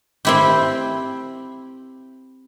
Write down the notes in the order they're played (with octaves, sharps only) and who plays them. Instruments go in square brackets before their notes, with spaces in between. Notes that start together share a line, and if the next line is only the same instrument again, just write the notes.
[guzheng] C4 E4 G4